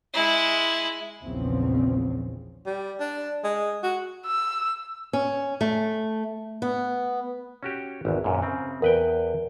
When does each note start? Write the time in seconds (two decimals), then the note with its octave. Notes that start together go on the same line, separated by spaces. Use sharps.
0.14 G#3 E4
1.24 A#1 E2 C#3 F3 C4
2.66 G3
3.00 D4
3.44 G#3
3.83 F#4
4.27 E6
5.13 C#4
5.61 A3
6.62 B3
7.63 C#4 F#4 G4
8.05 G#1 E2
8.24 F#2 A#2
8.42 C#3 C4
8.82 E2 A#4 B4 G5